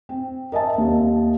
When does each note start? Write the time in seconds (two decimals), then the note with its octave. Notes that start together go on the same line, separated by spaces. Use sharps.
0.09 C4
0.52 A#4 D#5 E5 A5
0.78 D#2